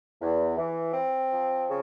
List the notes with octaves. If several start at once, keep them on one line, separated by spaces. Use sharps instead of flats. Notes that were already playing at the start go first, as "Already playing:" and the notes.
E2
E3
C4
F3
C#3